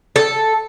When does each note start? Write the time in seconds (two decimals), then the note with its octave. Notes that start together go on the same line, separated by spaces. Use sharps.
0.16 A4